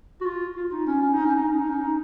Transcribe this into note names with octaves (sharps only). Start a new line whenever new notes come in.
F#4
F4
F4
D#4
C#4
C#4
D#4
C#4
D#4
C#4
D#4
C#4
D#4